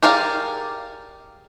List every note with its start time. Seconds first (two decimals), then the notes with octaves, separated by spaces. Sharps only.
0.03 G4 G#4 A#4 D5 F5